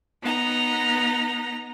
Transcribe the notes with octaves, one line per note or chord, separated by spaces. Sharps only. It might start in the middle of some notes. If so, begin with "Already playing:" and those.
B3 D#4 A#5